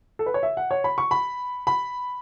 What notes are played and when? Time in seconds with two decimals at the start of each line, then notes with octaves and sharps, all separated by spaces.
0.19 A4
0.26 B4
0.34 C#5
0.43 E5
0.57 F#5
0.71 C#5
0.84 B5
0.98 C#6
1.11 B5
1.67 B5